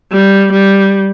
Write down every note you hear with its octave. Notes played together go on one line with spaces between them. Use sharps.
G3
G3